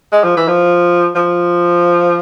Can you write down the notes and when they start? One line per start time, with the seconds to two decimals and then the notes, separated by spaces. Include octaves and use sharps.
0.12 G#3
0.24 F3
0.37 E3
0.48 F3
1.16 F3